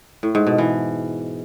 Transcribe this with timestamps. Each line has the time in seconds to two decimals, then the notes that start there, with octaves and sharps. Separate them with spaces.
0.23 A2
0.35 G#2
0.47 B2
0.58 E3